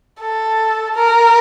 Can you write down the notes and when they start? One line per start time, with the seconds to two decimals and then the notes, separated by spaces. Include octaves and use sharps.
0.21 A4
0.96 A#4